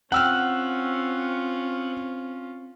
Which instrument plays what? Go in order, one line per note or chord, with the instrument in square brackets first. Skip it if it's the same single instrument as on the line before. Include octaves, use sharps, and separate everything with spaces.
[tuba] C4 [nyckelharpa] C#4 F4 [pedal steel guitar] F#5 [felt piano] G5 E6 F6